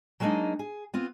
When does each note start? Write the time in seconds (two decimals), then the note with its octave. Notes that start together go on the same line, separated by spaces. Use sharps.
0.20 F#3 G#3 A#3 D4 D#4 D#5
0.59 G#4
0.94 B3 C4 F4